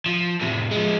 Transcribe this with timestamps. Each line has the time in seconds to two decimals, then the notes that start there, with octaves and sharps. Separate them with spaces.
0.06 F3
0.41 A2 C3
0.71 F3 G#3